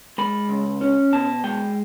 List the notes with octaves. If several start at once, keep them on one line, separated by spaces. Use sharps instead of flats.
G#3 B5
C#2
C#4
B2 A5
G#3 G5